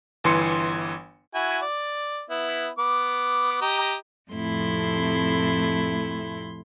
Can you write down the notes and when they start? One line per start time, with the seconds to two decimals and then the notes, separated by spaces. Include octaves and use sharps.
0.24 G1 E3 C6 C#7
1.35 E4 F#4 G#5
1.62 D5
2.30 B3 E4
2.79 B3 D6
3.62 G4 D#5 A#5
4.31 F2 A2 C3 A3 E4 C6